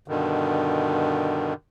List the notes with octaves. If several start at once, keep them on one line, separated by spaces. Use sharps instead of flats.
G2 B2 D3 D#3